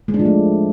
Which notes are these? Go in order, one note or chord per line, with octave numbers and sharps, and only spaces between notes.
G#3
D4
F3
A3